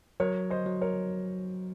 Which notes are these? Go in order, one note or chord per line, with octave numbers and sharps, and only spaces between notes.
F#3 A#4 C#5
C5 D#5
F#3
A#4 C#5